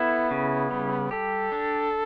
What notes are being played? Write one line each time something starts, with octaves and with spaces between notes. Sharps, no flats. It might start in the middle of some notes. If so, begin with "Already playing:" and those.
Already playing: B3 E4 A4
C#3
G3
G4 A4
D4